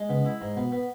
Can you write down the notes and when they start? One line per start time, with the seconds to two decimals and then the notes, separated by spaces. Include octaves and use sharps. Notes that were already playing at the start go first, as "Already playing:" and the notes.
Already playing: G#3
0.09 C#3 B3
0.25 E4
0.41 G#2
0.56 B2 B3
0.72 B3